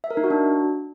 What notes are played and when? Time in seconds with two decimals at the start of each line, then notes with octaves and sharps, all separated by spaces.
0.04 E5
0.11 A#4
0.17 D#4
0.24 F#4
0.30 D4